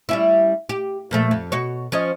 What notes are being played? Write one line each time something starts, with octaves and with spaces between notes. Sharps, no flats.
G3 C#4 E4
G4
A#2 F3 A3
F2
B2 F#4 C#5
F3 C#4 D#5